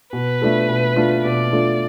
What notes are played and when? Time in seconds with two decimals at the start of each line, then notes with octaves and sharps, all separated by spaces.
0.13 B2 B4
0.42 A3 D4 F4 A4
0.69 B2
0.96 A3 D4 F4 A4
1.25 B2 D5
1.52 A3 D4 F4 A4